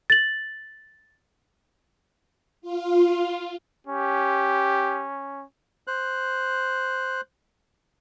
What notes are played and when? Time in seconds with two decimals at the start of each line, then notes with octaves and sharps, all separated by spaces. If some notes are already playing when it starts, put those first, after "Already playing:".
0.10 A6 F#7
2.62 F4
3.87 C#4 G4
5.87 C5 F#6